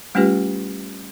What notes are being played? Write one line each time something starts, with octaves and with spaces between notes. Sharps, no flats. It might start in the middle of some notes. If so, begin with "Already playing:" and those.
G3 A3 C#4 F4 G4 B4